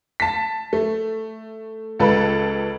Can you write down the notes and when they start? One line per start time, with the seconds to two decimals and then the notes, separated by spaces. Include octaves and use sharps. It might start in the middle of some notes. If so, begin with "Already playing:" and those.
0.20 A5 B6
0.73 A3
1.99 C#2 A4 B4